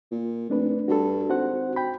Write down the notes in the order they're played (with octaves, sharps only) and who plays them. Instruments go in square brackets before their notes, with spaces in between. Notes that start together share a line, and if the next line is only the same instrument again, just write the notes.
[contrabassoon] A#2
[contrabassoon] F1 [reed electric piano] A3 D4 B4
[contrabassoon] G2 [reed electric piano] F#4 A4
[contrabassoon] G#1 [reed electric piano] F#4 C5 F#5
[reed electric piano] G5 B5